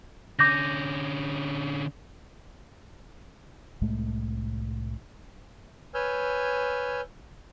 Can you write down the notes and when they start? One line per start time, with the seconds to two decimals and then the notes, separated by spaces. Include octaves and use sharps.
0.39 D3 C#4 D6 G6 A#6
3.81 C2 A2 G#3 A3
5.94 B4 C#5 G#5 E6 F6 G6